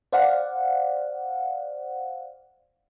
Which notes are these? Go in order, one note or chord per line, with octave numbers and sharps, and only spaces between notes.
C5 D5 F5 F#5